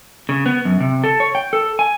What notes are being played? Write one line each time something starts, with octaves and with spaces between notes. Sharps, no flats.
C#3
B3
F#2
C3
A4
C#5
G5
A4
G#5